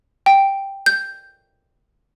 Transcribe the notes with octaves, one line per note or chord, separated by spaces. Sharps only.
G5
G6